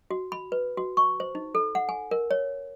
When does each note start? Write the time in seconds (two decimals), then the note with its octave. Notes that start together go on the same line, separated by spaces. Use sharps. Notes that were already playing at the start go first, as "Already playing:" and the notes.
0.11 F#4
0.32 B5
0.52 B4
0.77 F#4
0.97 C#6
1.20 C5
1.35 D#4
1.55 A4
1.75 F#5
1.89 G#5
2.11 A#4
2.31 C#5